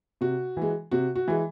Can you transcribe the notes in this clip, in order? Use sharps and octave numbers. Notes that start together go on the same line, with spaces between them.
C3 F#4
E3 G#3
C3 F#4
F#4
E3 G#3